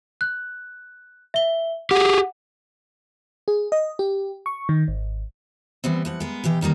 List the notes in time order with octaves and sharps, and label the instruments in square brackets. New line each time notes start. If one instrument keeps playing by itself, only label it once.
[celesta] F#6
E5 G7
[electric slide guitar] G4 G#4 [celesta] F#5
[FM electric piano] G#4
D#5
G4
C#6
D#3
G#1
[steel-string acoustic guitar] E3 G3 B3 C4
E3 F3 F#5
G#3 B3 A#4
B2 E3 G4 G5
D2 D#3 G3 A#3